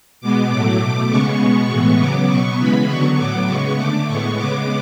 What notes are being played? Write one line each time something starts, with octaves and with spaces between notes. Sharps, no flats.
B2 G#3 B3 D6
A2 F#3 A3 D6
B2 A3
C#3 G#3 B3 C#6
B2 G#3 B3
A2 E3 G#3 B3
C#3 F#3 B3 D6
B2 F#3 B3 C#6
C#3 E3 G#3 B3 B5
D3 F#3 B3 C#6
A2 F#3 B3 D6
C#3 G#3 B3 C#6
D3 A3 D6
A2 G#3 B3 C#6
C#3 G#3 B3 D6